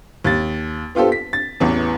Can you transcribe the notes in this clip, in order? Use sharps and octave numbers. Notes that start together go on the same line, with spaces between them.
D#2 A6
B3 F4 G4 A4 C5
B6
A6
A1 E2 E3